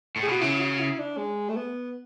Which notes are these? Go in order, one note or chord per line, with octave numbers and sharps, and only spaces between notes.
A2
G#4
B2 F#4
C#3 E4
F#4
E4
D4
G#3
A3
B3